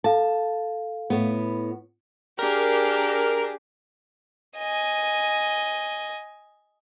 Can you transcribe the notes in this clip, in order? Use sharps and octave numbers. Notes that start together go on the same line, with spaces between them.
A4 F5 A5
A2 B3
D4 G4 G#4 A#4
D#5 G#5